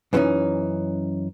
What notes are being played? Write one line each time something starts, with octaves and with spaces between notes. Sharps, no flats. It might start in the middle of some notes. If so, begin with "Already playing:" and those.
F#2 E3 G#3 B3 C#4 D#4